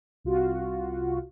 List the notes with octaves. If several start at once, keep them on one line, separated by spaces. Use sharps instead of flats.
C2 F4 F#4